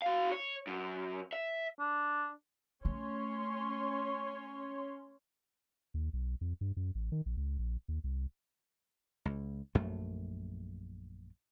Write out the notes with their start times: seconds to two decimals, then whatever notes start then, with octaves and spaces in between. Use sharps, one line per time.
0.02 F#4 F5
0.32 C#5
0.67 F#2
1.33 E5
1.80 D4
2.85 A3 C#4 C#5 C6
5.94 D#2
6.13 B1
6.41 F2
6.61 G2
6.77 F#2
6.95 A1
7.12 D#3
7.26 A#1
7.37 C#2
7.59 A#1
7.88 D#2
8.04 C2
9.25 C#2
9.75 A#1 F#2 A3